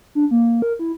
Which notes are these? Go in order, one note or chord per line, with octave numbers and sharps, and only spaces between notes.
D4
A#3
A#4
E4